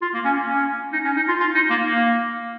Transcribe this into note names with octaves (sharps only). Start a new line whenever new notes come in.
F4
A#3
C#4
A#3
C#4
D#4
C#4
D#4
F4
F4
D#4
A#3
A#3